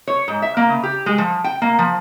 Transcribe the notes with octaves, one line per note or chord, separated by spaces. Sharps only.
C#5
G#2
E5
A#3
C#3
G4
G#3
F3
G5
A#3
F3